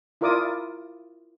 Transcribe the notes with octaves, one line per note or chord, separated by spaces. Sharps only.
E4 F4 A#4 D5 D6 D#6